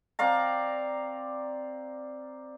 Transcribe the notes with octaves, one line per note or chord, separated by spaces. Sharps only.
C4 D5 F5 A#5